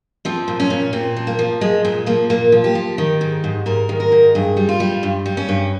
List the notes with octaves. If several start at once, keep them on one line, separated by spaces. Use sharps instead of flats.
F3 C4
A#2
C#4
A#2
A#2 C4
F3
A#3
F3
A#2 G#3
A#2 G#3
F3 A#3
A#2 A#3
F3
G4
F3
D#3
G#2
G#2
G#2 A#4
D#3
A#4
G#2
G2 G#4
G3
F4
G3
G2
G3
C#4
G2